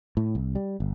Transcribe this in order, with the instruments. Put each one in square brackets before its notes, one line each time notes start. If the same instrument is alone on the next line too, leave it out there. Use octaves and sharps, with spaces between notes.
[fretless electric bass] A2
C2
G3
G1